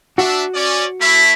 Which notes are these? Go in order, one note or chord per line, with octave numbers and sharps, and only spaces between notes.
D4 F#4 E5
C#4 D5
A3 E4 B6